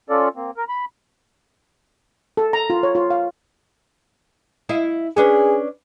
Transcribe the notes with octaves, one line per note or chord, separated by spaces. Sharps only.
C#4 F4 A4 D5
A#3 C4
A#4
B5
A4
A#5
F4
C#5
F4
F5
E4 D#5 F5
C#4 D4 G#4 B4